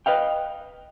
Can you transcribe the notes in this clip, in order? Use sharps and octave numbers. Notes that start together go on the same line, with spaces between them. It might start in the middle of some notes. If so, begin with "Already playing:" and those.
B4 D#5 F5 G5